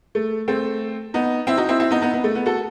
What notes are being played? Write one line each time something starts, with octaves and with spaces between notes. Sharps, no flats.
A3
A3 C4
B3 D#4
C4 E4
D#4 F#4
C4 E4
C4 E4
B3 D#4
B3 D#4
B3
A3
B3
F#4 A4